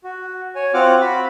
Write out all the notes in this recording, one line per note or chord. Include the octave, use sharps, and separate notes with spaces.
F#4
C#5 G#5
C4 F4 F#4 F#5 D6 F6
F#4 B5